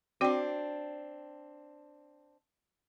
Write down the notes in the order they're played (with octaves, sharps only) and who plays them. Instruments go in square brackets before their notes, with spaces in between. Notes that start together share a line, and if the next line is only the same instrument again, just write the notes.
[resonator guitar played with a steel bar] C4 D4 [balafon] F#4 D5 G5